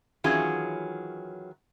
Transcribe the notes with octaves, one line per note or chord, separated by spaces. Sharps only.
D#3 E3 F#3 C#4 F4 G#4